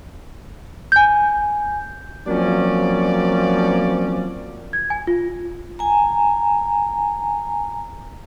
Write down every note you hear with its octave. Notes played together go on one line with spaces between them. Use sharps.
G#5 G6
F3 F#3 A#3 C4 C#4 D5
G#6
G#5
F4
G#5 A#5